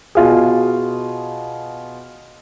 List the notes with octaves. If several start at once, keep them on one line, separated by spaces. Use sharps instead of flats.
B2 F4 G#4